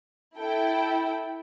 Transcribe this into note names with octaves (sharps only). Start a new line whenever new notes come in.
E4 A4 G5